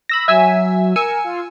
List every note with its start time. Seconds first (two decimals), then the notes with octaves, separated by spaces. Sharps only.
0.09 B5 E6 A#6
0.28 F#3 E5 G#5 E6
0.96 A#4 G#5 E6 C#7
1.24 F4